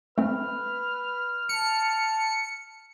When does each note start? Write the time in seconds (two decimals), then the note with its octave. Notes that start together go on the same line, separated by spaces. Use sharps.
0.18 A3 C4 B4 F6
1.49 A5 C#7